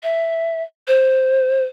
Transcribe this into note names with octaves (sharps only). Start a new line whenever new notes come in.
E5
C5